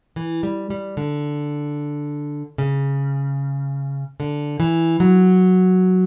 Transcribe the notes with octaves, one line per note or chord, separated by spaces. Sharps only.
E3
G3
G3
D3
C#3
D3
E3
F#3